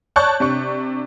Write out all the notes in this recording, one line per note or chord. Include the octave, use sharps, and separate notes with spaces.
C#5 D5 A5 C#6 F#6 G6
C3 D4 C#6